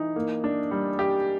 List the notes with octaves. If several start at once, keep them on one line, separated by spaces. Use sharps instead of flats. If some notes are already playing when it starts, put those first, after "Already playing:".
Already playing: E3 D#4
A#3
D4
G3
G4